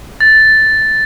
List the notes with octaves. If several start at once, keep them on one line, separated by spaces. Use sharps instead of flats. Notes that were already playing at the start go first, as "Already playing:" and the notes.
A6